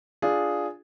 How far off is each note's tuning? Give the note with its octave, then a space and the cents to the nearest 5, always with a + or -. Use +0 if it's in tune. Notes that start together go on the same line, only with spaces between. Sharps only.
D4 +0 F4 +0 G#4 +0